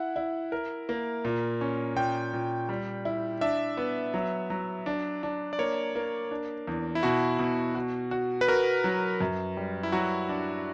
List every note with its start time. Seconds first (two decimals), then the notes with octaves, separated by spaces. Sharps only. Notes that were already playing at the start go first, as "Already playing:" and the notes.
Already playing: E4 F#5
0.16 E4
0.52 A#4
0.89 A#3
1.25 A#2
1.61 C#4
1.96 A#2 G5
2.33 A#2
2.69 G3
3.05 E4
3.41 D4 E5
3.77 B3
4.14 F#3
4.50 F#3
4.86 D4
5.23 D4
5.53 D5
5.59 A#3 C#5
5.95 A#3
6.31 D4
6.67 E2
6.95 E4
7.03 B2 F#4
7.39 B2
7.75 F#4
8.11 F#4
8.41 B4
8.48 F#4 A#4
8.84 F#3
9.21 F#2
9.57 G3
9.83 E4
9.92 F#3 F#4
10.29 D4